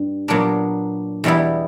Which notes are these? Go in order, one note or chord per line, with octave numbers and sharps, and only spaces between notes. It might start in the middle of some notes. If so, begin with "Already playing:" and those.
Already playing: G2
A#2 F#3 B3 D4 A#4
E2 B2 G3 B3 E4